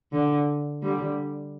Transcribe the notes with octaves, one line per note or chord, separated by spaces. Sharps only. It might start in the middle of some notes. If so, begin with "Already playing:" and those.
D3
D3 G3